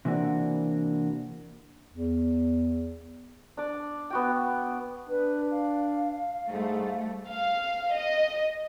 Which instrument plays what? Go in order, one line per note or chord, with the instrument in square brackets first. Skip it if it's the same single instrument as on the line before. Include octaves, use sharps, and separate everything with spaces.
[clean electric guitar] C3 E3 A#3 D4 F#4
[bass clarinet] E2
[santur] D4 D5
B3 F#4 G5
[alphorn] D4 [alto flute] B4
[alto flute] F5
[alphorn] G#2 [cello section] G3 A3
[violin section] F5
D#5